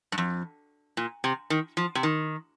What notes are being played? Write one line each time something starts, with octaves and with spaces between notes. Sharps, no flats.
G2
F2
A#2
C3
D#3
F3
C3
D#3